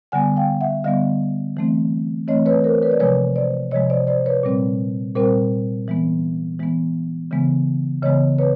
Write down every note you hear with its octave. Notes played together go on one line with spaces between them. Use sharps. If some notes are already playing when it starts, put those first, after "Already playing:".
D3 G3 B3 F#5 G#5
F5 G5
E5 F#5
D3 G3 B3 D#5 F5
E3 A3 C4
E3 A3 C4 C#5 D#5
B4 C#5
A#4 C5
B4 C#5
D5
C3 F3 G#3 B4 C#5
C5 D5
C3 F3 G#3 C#5 D#5
C5 D5
C5 D5
B4 C#5
A#2 G3 C4
A#2 G3 C4 A#4 C5
E3 G#3 B3
E3 G#3 B3
C#3 E3 G#3 B3
C#3 E3 G#3 B3 C#5 D#5
B4 C#5